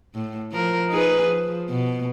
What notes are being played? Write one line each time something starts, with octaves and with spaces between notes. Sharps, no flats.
A2
F3 A#4
D#4 G#4 B4
F3
B2